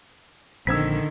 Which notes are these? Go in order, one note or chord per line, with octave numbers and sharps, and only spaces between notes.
A#1 D3 D#3 C4 E6 G#6 B6